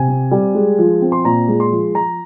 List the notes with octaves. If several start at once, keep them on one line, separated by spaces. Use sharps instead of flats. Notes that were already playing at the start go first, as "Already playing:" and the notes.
Already playing: C3 G#5
C4
G3
G#3
F3
C4
C6
A#2 A#5
G#3
C6
F3
F3 A#5